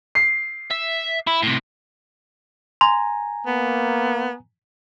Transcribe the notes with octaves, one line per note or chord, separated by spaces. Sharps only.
C7
E5
E4
A2 C3
G#5 A#5 C6
A#3 B3